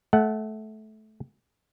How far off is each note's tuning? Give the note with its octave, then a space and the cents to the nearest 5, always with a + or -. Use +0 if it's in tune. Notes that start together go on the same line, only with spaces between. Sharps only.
A3 -20 F#5 +10